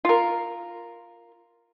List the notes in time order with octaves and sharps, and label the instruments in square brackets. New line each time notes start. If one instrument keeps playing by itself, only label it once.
[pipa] F4 A#4